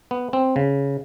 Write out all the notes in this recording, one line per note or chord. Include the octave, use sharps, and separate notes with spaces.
B3
C4
C#3